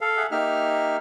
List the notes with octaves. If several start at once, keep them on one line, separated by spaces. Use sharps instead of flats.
A4 F5
G#4 E5 F#5
A#3 D#4 G4 E5 F6